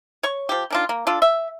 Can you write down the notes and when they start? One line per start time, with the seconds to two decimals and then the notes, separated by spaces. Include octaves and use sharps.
0.23 C#5 C#6
0.49 F3 G4
0.70 D#3 D4 F4
0.89 A#3
1.07 D4 F4 A4
1.22 E5